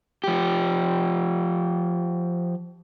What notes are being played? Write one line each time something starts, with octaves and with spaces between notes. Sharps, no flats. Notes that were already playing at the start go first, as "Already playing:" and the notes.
F3 G4